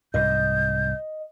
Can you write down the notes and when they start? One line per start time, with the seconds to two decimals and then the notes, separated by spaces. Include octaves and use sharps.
0.14 C2 G#2 D#5 G6